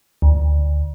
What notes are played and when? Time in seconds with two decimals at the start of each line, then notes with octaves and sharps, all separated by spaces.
0.22 D2